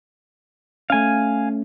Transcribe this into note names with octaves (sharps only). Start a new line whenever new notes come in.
A3 C#4 F5 G#5